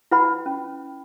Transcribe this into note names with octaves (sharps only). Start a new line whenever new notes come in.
E4 B4 F#5 B5
C#4